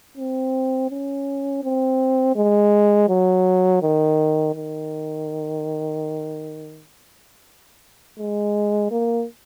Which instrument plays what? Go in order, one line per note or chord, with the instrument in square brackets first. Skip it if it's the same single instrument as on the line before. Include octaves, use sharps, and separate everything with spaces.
[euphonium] C4
C#4
C4
G#3
F#3
D#3
D#3
G#3
A#3